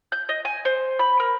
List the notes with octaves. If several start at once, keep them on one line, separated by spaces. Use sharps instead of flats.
G6
D#5
G#5
C5
B5
A#4